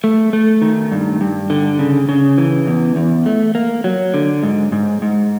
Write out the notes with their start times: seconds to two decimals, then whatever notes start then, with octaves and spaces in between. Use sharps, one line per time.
0.04 A3
0.33 A3
0.61 D#3
0.91 G2
1.21 G2
1.50 D3
1.79 C#3
2.09 C#3
2.38 E3
2.67 E2
2.96 E2
3.26 A3
3.55 A#3
3.84 F#3
4.14 D3
4.43 G#2
4.72 G#2
5.02 G#2